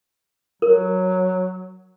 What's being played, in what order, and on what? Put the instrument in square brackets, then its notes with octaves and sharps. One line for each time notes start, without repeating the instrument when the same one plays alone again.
[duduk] F#3 [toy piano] A#4